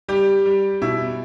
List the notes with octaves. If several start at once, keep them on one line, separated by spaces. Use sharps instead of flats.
G3 G4
G3
B2 E4